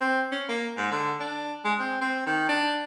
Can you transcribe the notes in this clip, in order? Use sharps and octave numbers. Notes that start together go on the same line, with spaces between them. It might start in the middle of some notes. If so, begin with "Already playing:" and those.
C4
C#4
A#3
G#2
D3
D4
G#3
C4
C4
D#3
D4